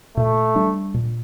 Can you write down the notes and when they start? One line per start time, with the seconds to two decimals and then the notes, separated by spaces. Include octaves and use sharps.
0.17 A#2 A3
0.56 G3 D4
0.94 A#2